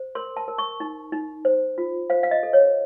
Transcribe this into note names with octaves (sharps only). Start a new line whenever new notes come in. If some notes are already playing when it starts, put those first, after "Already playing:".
Already playing: C5
A#4 C6
A5
A#4
C#6
D#4
D#4
C5
F4
C5 F5
F5
D#5
A4
C#5